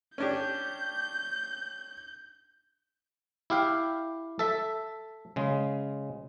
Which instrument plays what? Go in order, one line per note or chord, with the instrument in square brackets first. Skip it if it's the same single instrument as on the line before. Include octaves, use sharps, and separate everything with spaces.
[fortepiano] C#4 D4 G4 [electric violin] G6
[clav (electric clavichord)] E4 G4 F5 G5
A4 E5
C#3 G#3